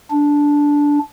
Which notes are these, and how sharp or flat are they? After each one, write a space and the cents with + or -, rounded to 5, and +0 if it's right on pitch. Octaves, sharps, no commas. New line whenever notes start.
D4 -10